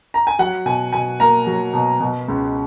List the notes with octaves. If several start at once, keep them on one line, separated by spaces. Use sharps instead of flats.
A#5
G#5
F#3 F#5
B2 G#5
B2 G#5
A#3 A#5
F#3
B2
B2
C#2